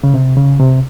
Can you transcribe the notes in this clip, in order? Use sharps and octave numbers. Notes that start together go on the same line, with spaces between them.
C#3
C3
C#3
C3